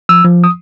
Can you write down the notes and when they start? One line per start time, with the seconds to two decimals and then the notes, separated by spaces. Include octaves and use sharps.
0.09 F3 E6
0.25 F3
0.44 D#6